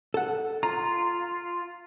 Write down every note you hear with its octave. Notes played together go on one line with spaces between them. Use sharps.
A4 F#5
F4 A#5